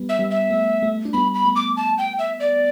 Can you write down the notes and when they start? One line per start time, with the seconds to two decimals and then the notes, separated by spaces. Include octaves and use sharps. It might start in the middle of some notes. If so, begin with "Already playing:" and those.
Already playing: G3 B3
0.09 E5
0.19 G3 B3
0.30 E5
0.50 A3
0.83 A3
1.05 D4
1.13 G3 B3 B5
1.34 B5
1.46 A3
1.56 D6
1.77 A5
1.98 G5
2.19 E5
2.40 D5